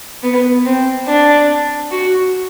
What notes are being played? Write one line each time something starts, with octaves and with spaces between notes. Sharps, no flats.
B3
C4
D4
F#4